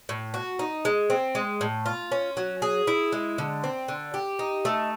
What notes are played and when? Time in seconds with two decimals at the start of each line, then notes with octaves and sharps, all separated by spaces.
0.09 A2
0.34 F#4
0.59 D#4
0.85 G#3
1.10 C4
1.35 G#3
1.61 A2
1.86 F4
2.12 C#4
2.37 F#3
2.62 G#4
2.87 E4
3.12 G#3
3.38 D3
3.64 C4
3.88 D3
4.14 G4
4.39 D#4
4.65 A3